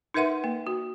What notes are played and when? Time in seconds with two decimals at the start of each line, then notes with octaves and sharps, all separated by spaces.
0.14 D#4 A#4 B4 E5 F#5 C6
0.44 A#3
0.67 F#4